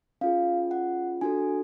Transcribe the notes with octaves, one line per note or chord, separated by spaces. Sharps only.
C#4 F4 G#4 F5
F#5
D4 F#4 A4 G#5